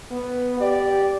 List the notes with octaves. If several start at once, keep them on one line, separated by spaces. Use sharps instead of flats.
B3
G4 D5